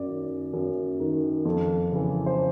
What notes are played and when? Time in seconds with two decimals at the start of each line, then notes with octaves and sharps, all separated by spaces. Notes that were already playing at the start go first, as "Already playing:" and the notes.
Already playing: F#2 D5
0.08 D#3
0.53 F#2
1.00 D#3
1.45 F2
1.92 C#3 E3
2.26 C5